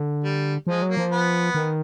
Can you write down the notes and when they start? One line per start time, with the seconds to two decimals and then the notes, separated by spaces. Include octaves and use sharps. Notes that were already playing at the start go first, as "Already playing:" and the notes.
Already playing: D3
0.24 G3
0.67 F3 G#3
0.82 F#3
0.89 A#3
0.97 F3
1.11 B3
1.55 D#3